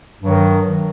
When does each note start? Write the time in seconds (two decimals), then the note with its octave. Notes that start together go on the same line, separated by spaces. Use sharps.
0.20 G2
0.24 F#3
0.27 D#3